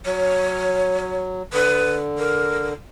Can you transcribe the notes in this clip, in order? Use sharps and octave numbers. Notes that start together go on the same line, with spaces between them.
F#3 C#5
D3 B4
A#4